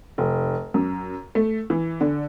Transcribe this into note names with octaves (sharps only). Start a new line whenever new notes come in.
F1
F#2
A3
E3
D3